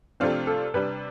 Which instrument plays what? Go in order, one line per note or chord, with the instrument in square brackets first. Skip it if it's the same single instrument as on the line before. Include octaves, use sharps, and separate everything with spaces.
[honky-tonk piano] C3 F3 A3 D4 F4 [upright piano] C4
[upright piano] A4
[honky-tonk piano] C3 G3 D4 [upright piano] B4